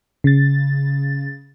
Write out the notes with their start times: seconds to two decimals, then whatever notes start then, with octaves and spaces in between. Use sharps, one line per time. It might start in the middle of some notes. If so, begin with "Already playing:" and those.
0.24 C#3 A6